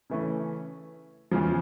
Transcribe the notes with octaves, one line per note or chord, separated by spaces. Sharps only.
C#3 E3 A3 C#4
E2 C#3 F3